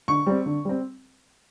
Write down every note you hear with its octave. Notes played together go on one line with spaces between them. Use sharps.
D3 C#6
G3 C4
D3
G3 C4